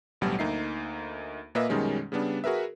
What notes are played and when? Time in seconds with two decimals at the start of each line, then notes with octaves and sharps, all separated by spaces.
0.21 A1 D2 B2 F#3 G3
0.39 D2 A#3 D#4 E5 C7
1.55 A#2 A#3 B4 D#5 E5 E6
1.69 F#2 B2 D#3 G3 G#3 C#4
2.12 C#3 G3 B3 D4
2.44 F#4 G#4 A#4 B4 E5